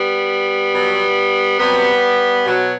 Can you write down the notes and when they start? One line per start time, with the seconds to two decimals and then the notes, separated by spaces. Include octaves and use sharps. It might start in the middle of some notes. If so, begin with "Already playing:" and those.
Already playing: G3 B3
0.74 B2 F#3
1.59 C3 F#3 G3 B3
2.45 B2 F#3